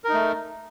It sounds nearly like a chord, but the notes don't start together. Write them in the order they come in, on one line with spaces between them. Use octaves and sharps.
A#4 D#4 A3